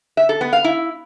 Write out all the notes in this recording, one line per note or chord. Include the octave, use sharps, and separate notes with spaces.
E5
A4
B3
F5
E4